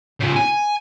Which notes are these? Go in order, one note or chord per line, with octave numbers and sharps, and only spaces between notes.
C#3 F3
G#5